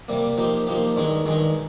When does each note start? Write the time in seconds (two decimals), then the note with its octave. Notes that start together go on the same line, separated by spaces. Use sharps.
0.08 C3 G3 A#3
0.37 F3 A#3 D#4 G4
0.67 F3 A#3 D#4 G4
0.96 G2 D#3 G#3 D#4 G#4
1.26 G2 D#3 G#3 D#4 G#4